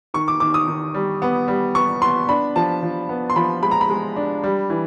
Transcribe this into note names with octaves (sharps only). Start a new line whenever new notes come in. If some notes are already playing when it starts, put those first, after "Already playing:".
D#3 C#6
D6
D#3 D6
D#6
D#3
G3
B3
G3
B3 C#6
B3 C6
D4 B5
F3 A5
F3
B3
C6
F3 B5
G#3 B5
A#5
B5
G#3
D4
G3
E3